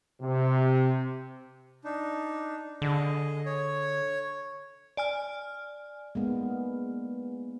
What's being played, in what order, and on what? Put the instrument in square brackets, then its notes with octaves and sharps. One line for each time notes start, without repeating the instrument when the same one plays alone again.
[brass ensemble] C3
[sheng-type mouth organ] D4 D#4
[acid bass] D3 [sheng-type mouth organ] G#4 D#5
[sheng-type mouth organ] C#5
[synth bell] D5 G#5 F6
[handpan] G#3 A#3 B3